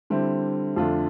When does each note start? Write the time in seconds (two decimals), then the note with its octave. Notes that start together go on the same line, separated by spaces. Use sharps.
0.10 D3 G3 C4 E4
0.76 F2 D3 A3 D4 F4